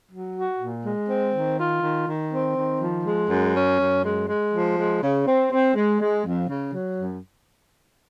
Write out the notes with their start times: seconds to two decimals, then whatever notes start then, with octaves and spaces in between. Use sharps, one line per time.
0.09 F#3
0.34 F#4
0.58 A#2
0.83 G#3
1.08 C4
1.33 D#3
1.56 F4
1.81 D#3
2.05 D#3
2.31 C4
2.55 D#3
2.80 F3
3.04 G#3
3.29 F#2
3.54 C#4
3.77 F#2
4.03 G#3
4.27 G#3
4.51 F3
4.76 G#3
5.01 C#3
5.26 C4
5.50 C4
5.74 G#3
5.99 G#3
6.24 F2
6.48 C#3
6.73 F#3
6.97 F#2